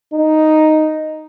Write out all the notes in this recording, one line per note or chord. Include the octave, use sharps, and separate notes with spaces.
D#4